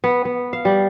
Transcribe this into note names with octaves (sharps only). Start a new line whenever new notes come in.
B3
B3
F5
G3